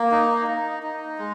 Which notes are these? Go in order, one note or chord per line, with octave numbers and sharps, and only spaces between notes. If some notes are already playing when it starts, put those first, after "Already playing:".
Already playing: A#3
D#4
D#4
D#4
G#3